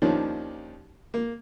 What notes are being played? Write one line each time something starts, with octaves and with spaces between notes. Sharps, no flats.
D#2 D#3 F3 C#4 D4
A#3